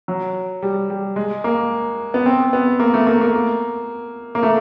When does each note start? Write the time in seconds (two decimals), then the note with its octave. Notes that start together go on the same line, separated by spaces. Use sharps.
0.08 F#3
0.62 G3
0.90 G3
1.16 G#3
1.44 A#3
2.14 B3
2.26 C4
2.53 B3
2.80 A#3
2.94 A3
3.07 A#3
3.21 A#3
4.35 A#3
4.43 A3